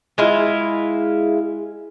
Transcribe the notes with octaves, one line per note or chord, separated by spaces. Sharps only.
G#3 E4 F4